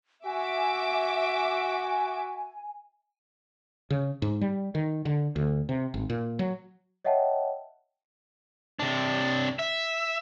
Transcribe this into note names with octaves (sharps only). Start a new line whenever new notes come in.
F#4 E5 G#5 D6
C#3
G#2
G3
D#3
D3
D2
C3
G#1
A#2
F#3
C#5 D#5 E5 F#5 G5 A5
C3 D4
E5